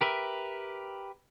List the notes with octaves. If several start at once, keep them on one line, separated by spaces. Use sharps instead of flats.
G4 A#4 B4 E5